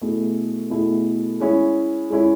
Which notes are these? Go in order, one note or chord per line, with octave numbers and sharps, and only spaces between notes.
B2 A3 E4 G#4
B2 A3 E4 G#4
G#3 C#4 E4
G#3 C#4 E4